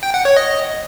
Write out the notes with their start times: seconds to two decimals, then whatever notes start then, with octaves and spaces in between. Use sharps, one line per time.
0.03 G5
0.14 F#5
0.25 C#5
0.36 D#5